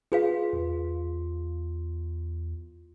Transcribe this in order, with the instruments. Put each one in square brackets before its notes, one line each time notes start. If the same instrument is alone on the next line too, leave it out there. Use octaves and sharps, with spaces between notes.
[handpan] F4 [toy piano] G#4 B4 F5
[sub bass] E2